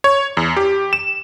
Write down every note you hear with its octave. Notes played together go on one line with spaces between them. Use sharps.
C#5
E2
G4
E7